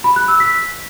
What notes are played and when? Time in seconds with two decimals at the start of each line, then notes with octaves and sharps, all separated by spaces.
0.04 B5
0.16 F#6
0.28 E6
0.40 B6